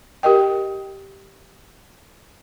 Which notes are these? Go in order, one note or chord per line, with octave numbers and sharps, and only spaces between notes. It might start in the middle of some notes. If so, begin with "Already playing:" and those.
G4 A#4 D#5 G5